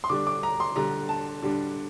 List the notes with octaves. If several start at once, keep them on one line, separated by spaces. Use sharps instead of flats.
C6
D3 G3 D4 D6
D6
A#5
C6
D3 G3 D4 A#5
A5
D3 G3 D4